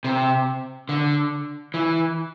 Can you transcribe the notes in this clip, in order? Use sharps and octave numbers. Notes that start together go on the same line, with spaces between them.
C3
D3
E3